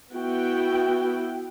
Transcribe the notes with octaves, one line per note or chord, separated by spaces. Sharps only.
B3 E4 F#4 G5